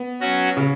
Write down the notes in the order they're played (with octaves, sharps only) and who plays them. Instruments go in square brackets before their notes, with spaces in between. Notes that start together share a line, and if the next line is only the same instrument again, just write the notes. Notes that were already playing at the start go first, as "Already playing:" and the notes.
Already playing: [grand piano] B3
[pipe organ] F#3 C#4 F#4
[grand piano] C#3